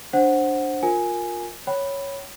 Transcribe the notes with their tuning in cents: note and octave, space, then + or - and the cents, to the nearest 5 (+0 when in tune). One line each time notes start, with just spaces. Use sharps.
D4 +0 C5 +15 F#5 +0
F4 +20 A#4 +0 G#5 +0
C#5 +0 G5 -35 B5 +0